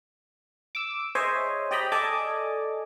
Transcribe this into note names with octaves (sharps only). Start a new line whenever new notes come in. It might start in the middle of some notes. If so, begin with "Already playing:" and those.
D6 E6
G#4 C5 C#5 D#5 E5 G#5
G4 D5 D#5 G5 A#5 B5
A4 D5 D#5 G#5 A5 D6